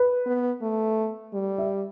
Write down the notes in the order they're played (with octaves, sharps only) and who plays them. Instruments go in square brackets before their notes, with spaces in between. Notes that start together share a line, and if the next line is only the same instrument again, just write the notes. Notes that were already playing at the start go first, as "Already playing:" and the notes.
Already playing: [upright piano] B4
[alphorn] B3
A3
G3
[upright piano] E5